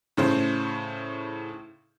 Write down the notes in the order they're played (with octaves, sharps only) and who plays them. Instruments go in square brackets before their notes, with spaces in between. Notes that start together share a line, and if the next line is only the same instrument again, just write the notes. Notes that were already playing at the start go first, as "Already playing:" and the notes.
[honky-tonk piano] A2 C#3 C5